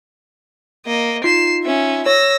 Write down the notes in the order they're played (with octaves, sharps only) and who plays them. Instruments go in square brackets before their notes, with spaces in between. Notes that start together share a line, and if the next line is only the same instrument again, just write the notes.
[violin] A#3 D#5
[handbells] D#4 F4 [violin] C7 E7
[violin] C#4 E5
[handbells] C#5 [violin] E6 A#6